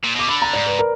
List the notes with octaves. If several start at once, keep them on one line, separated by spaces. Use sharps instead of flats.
A#2
B2 D6
D3 B5
A#5
G#2 D5
B4
A#4